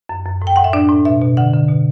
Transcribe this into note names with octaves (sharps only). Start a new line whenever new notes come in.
F#2
F#2
A2
G5
A2 F#5
E5
D4 D5
A2
B2 E5
B2
D3 F#5
D3
B2